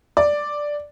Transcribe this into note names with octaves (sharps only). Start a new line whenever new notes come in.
D5